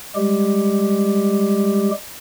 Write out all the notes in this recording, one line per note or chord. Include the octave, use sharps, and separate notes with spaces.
G3 G#3 G4